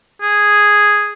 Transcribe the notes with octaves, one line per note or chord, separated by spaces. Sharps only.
G#4